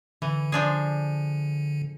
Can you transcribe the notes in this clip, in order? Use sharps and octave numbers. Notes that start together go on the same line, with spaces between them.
D3 E3
F3 D4 G#4